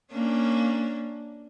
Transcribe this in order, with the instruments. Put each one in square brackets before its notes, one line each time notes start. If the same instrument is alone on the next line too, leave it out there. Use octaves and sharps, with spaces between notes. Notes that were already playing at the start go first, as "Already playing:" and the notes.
[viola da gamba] A#3 C#4 D4